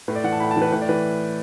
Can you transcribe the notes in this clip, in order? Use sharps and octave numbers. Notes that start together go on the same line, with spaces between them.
A2 B4
D5
E3 F#5
A5
A2 B5
A5
E3
B4
A2 B4
D5
E3 B4